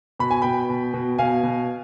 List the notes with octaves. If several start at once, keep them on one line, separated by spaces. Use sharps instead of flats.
B2 B5
G#5
B2 G5 B5
B2
B2
B2 F5 G#5
B2